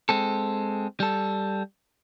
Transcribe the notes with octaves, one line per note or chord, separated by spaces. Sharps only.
G#3 C4 A4
G3 A4